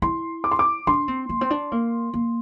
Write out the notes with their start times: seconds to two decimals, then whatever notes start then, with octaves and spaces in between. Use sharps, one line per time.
0.02 E4 C6
0.44 D6
0.52 C6
0.59 D6
0.87 D4 C6
1.08 C4
1.29 A#3
1.41 C4
1.50 D4
1.72 A#3
2.14 A#3